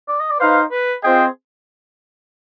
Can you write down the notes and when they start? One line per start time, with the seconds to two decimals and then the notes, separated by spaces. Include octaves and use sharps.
0.08 D5
0.20 D#5
0.31 D5
0.39 D#4 B4 C5 F5
0.71 B4
1.03 C4 F4 G#4 C5 D#5 G5